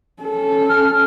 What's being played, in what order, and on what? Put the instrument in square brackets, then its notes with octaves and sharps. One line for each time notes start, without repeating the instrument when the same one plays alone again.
[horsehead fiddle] C#4 A4
[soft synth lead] F6